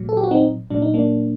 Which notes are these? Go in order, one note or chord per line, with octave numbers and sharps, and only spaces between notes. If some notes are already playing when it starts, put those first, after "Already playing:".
Already playing: A#2 F#3
A4
G4
F#4
C4 D#4
A#2 F#3 D4
D#4
A#3 D4